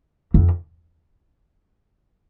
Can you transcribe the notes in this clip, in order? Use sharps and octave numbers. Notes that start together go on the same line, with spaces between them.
F2